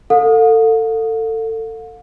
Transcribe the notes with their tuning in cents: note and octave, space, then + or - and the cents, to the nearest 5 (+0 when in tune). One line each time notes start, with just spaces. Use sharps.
A4 +25 F5 +45